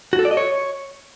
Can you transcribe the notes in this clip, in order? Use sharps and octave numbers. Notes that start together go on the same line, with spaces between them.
F#4
A4
D5
D#5
C#5